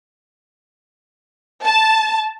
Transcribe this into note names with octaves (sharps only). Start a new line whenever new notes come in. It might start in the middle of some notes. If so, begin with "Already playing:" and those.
A5